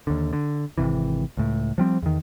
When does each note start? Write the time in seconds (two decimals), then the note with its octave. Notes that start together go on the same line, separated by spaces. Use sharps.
0.07 D#2 D3
0.33 D3
0.78 G#1 C#2 C3 E3
1.37 C#2 A2
1.78 F3 G3 C4
2.02 E2 D#3